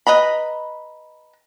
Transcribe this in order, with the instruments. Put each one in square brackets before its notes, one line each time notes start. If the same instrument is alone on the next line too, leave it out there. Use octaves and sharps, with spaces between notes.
[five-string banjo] B4 D#5 A#5 B5